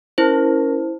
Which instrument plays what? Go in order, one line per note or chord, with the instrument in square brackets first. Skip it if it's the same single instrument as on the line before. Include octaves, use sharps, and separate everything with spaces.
[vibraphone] C#4 A#4 [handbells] E4 C5